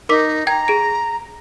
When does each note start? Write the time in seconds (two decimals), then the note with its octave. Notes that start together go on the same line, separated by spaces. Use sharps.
0.09 D#4 A#4 D6 B6
0.47 G5 A#5 G#6
0.68 G#4 D7